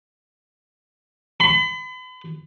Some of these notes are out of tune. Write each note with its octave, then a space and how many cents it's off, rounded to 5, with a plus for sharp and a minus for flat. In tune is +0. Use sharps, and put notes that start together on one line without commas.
B5 +40